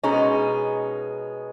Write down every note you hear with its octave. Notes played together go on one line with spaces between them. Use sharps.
B2 G#3 C#4 D#4